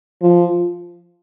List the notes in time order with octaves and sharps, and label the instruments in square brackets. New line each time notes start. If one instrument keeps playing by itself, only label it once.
[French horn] F3